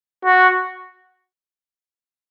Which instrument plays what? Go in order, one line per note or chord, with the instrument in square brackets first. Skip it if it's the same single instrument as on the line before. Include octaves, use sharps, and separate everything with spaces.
[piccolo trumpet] F#4